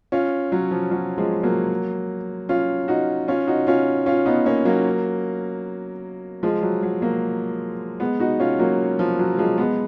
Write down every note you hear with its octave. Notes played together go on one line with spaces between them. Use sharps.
C#4 F4
F#3
F3
F#3
F3 G#3
F#3 A#3
C#4 F4
D#4 F#4
C#4 F4
D#4 F#4
C#4 F4
C#4 F4
B3 D#4
A#3 C#4
F#3 A#3
F3 G#3
F#3
F#3
F#3 A#3
G#3 B3
D#4 F#4
C#4 F4
F#3 A#3
F3
F#3
F3 G#3
G#3 B3